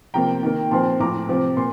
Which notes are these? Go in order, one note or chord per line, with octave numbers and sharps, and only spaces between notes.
C3 F3 A#3 G5 A#5
D#3 A#3
A#2 F3 C4 A5 C6
A2 F3 C4 A#5 D6
C3 F3 C4
A#2 C6